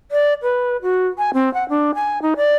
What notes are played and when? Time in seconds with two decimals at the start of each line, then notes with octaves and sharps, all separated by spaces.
0.11 D5
0.43 B4
0.82 F#4
1.18 G#5
1.34 C4
1.54 F#5
1.69 D4
1.95 G#5
2.22 D#4
2.37 D5